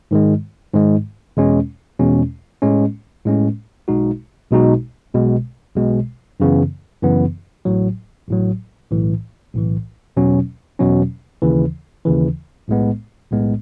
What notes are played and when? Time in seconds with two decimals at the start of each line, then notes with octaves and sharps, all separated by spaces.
0.11 G#2 D#3 G#3
0.74 G#2 D#3 G#3
1.37 E2 B2 G#3 C#4
1.99 E2 B2 G#3 C#4
2.62 A2 G#3 C#4
3.25 A2 G#3 C#4
3.88 B1 B2 G#3 D#4 F#4
4.51 B1 B2 G#3 D#4 F#4
5.14 B1 B2 G#3
5.76 B1 B2 G#3
6.40 F#2 C#3 E3 B3
7.02 F#2 C#3 E3 B3
7.65 A1 A2 F#3
8.28 A1 A2 F#3
8.91 B1 A2 E3
9.54 B1 A2 E3
10.17 E2 B2 F#3 C#4
10.79 E2 B2 F#3 C#4
11.42 D#2 C#3 E3
12.05 D#2 C#3 E3
12.68 B1 A2 G#3 B3
13.31 B1 A2 G#3 B3